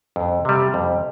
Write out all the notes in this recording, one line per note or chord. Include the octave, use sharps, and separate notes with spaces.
F2
C3 G3
F2